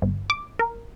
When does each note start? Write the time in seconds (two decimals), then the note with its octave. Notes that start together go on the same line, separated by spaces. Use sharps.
0.02 G1
0.30 D6
0.59 A#4